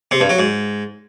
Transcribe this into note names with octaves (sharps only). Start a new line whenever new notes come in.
C3
G2
F#3
G#2